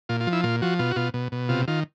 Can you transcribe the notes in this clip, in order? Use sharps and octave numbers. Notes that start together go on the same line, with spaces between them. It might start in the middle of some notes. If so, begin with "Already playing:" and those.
A#2 F4
F4
F3
E4
A#2 F4
F3 F#4
B2 F4
F#4
B2 F4
B2
B2
C3 F4
D#3 F4